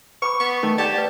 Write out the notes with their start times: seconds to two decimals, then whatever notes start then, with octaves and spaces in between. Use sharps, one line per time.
0.22 B4 B5 C#6 D6
0.40 B3 C#6
0.63 D#3 A3
0.78 G4 D5 G5 A5
0.95 B4 D5